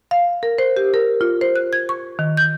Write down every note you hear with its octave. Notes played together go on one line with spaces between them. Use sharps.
F5
A#4
C5
G4
A#4
F4
C5
F#6
G#6
C#6
D#3
G6